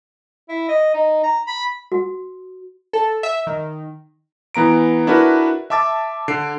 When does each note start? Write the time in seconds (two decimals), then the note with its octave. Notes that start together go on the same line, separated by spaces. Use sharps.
0.49 E4
0.69 D#5
0.94 D#4
1.24 A#5
1.47 B5
1.92 F#4
2.93 A4
3.23 E5
3.47 D#3
4.55 E3 B3 A#5 D7
5.07 D4 E4 F#4 A#4 B4
5.70 E5 A5 D6 E6 A6
6.28 D3 C7 D7